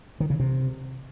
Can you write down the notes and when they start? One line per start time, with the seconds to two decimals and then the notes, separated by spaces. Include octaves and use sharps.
0.20 D#3
0.30 C#3
0.40 C3